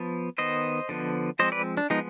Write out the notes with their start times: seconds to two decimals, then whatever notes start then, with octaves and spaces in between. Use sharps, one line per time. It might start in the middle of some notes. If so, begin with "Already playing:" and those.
Already playing: F3 B3
0.38 D#3 B3 C5 D#5
0.89 D3 F3 B3
1.39 F3 G#3 C4 C5 D#5
1.52 B4 D5
1.77 D4
1.90 F3 G#3 B3 D#4